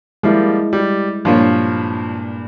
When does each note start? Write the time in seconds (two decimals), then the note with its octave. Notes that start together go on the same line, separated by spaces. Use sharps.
0.23 F3 G3 G#3 A#3 E4
0.73 G3
1.25 G2 A#2 F3 F4 C#5